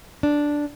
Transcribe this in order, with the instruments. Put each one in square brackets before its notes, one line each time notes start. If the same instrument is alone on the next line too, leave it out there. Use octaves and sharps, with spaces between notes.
[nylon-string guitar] D4